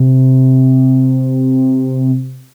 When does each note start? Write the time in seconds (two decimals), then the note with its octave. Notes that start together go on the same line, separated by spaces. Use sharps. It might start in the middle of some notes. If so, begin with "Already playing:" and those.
Already playing: C3